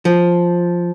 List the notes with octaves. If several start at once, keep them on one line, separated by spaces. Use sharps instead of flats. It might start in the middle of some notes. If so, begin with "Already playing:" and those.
F3